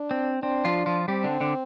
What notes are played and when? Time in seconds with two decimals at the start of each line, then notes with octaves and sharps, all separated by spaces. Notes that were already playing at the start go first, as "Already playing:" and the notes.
Already playing: D4
0.11 C4
0.42 C4 D4
0.65 F3 F4
0.86 F3 F4
1.08 G3 C4 G4
1.24 D3 D4
1.40 D3 D4